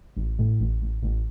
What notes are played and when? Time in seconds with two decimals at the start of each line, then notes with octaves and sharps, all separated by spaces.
0.17 A1
0.39 A2
0.60 A1
0.82 A1
1.03 A1